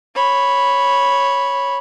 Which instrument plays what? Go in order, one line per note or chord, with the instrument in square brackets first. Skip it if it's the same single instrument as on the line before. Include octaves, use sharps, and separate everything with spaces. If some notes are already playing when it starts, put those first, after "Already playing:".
[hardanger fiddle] C#5 B5